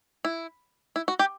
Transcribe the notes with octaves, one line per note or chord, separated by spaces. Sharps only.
E4
E4
F#4
G4